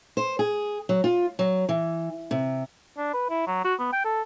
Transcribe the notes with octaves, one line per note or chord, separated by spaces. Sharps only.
C5
G#4
F#3
F4
F#3
E3
C3
D4
B4
E4
F#3
F#4
B3
G5
A4